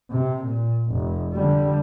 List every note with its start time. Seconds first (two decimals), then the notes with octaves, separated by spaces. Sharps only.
0.11 C3
0.45 A#2
0.92 F1
1.33 D3 G3